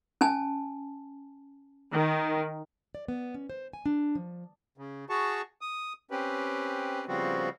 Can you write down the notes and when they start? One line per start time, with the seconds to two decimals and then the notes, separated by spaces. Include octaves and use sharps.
0.21 C#4 G#5 A5
1.91 D#3
2.95 D5
3.08 B3
3.34 C#4
3.50 C5
3.73 G#5
3.86 D4
4.15 F3
4.78 C#3
5.09 F#4 G#4 A5 C#6
5.61 D#6
6.11 C4 C#4 G4 B4
7.08 C#3 F3 G3 B3 C4 F#4